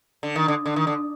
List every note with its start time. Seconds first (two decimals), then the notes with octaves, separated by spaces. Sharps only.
0.23 D3
0.36 D#3
0.48 D3
0.66 D3
0.76 D#3
0.87 D3